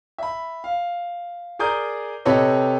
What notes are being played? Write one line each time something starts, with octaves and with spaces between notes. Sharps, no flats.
E5 B5
F5
G#4 A#4 D5 A#5 D#6 G6
C3 G4 A4 B4 C#5 D#5